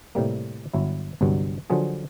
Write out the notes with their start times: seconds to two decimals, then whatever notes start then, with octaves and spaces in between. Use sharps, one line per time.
0.15 A2 C3 G3 A#3
0.74 G1 F#3 E4
1.21 G1 C2 G2 F#3
1.70 D3 F3 F#3 F4 G#4